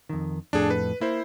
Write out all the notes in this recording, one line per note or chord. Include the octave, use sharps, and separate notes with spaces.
F2 D#3
F2 A2 D4 G#4 A4
B4
A#3 E4 C5